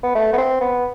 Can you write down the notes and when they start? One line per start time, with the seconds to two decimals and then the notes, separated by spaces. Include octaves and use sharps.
0.03 B3
0.15 A3
0.33 B3
0.38 C4
0.61 B3